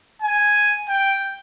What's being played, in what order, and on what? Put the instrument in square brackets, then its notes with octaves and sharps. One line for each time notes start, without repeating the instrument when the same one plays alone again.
[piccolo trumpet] G#5
G5